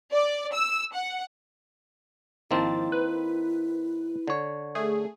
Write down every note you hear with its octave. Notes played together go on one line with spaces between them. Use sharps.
D5
E6
F#5
G#1 D#3 F3 A#3 C4 E4 A6
B4
D3 C#5
A3 G#4